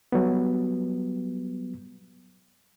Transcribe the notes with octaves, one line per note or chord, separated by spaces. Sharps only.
F#3 G3 B3